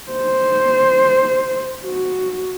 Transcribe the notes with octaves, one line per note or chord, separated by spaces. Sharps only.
C5
F#4